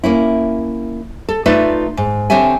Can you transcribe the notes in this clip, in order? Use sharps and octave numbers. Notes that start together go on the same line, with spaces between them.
A#3 C#4 E4
A4
A3 D#4 F4 B4 D5 E5
G#2
D3 C4 G4 C#5 E5 G#5